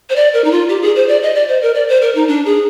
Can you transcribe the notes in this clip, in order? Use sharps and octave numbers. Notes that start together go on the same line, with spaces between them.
C5
D5
A#4
D#4
F4
G4
G#4
C5
D5
D#5
D5
C5
A#4
D5
C5
A#4
D#4
D4
G#4